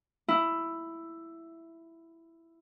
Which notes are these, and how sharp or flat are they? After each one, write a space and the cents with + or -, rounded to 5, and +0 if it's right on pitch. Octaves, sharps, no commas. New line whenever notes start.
E4 +5